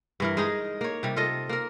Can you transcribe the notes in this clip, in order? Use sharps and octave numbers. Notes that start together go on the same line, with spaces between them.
G2 E3 A#4
G#3 D#4 G#4
A#3 C#5
C3 G3
F4 A4 D#5
A#3 A#4